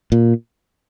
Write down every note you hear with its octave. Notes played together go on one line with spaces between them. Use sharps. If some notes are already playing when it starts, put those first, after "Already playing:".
A#2